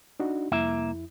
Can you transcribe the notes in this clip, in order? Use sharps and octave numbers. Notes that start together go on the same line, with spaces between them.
D4 D#4 F#4
C2 F2 A#3 E4 E5